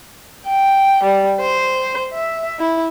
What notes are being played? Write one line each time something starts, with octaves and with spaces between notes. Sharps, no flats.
G5
G3
C5
E5
E4